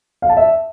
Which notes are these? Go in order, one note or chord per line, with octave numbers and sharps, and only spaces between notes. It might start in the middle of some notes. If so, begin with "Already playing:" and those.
F5
A5
E5